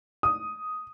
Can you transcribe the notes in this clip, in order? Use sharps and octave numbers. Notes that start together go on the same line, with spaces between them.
D#6